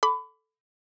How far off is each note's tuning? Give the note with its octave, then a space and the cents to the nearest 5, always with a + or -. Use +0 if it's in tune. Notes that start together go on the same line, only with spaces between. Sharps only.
A4 +0 B5 +25 D6 -20